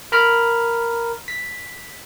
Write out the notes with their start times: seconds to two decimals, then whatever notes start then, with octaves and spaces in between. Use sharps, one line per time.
0.12 A#4 A#5 B5 F6
1.28 B6